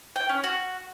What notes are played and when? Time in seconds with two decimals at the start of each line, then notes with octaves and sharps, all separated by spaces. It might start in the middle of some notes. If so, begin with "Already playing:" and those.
0.16 G5
0.29 C#4
0.44 F#4